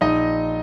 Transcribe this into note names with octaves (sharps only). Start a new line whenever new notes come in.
A#1 D#4 D#5